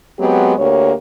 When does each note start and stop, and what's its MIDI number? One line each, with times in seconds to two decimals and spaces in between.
0.18 0.54 54
0.18 0.54 56
0.18 0.54 59
0.18 0.54 60
0.18 0.54 67
0.57 0.92 38
0.57 0.92 58
0.57 0.92 67
0.57 0.92 73